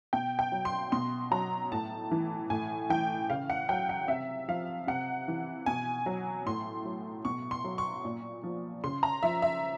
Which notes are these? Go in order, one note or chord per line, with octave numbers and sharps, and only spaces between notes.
B2 G5
G5
F#3
C6
B2 C6
F#3 A#5
A2 A5
E3
A2 G#5
E3 G5
C#3 F5
F#5
F#3 G5
F#5
C3 E5
F3 F5
C3 F#5
E3
B2 G#5
F#3
A2 C6
F#3
B2 C#6
C6
F#3
C#6
A#2
F3
C#3 C6
A#5
F3 E5
E5